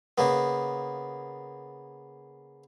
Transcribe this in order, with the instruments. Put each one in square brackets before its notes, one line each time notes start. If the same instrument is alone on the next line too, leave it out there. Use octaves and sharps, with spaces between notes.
[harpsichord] C#3 A#3 B3